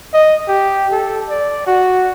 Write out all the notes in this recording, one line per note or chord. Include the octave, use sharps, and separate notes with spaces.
D#5
G4
A4
D5
F#4